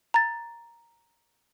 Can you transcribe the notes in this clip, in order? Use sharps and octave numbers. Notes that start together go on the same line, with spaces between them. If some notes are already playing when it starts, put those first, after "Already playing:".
A#5 A6